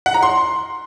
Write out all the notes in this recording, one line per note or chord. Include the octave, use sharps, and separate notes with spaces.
F#5
A#5
C6